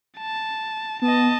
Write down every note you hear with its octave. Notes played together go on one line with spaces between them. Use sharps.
A5
B3 D#5 A5